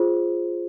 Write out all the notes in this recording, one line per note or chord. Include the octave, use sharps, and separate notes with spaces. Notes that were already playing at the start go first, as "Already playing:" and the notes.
Already playing: F4 G#4 C5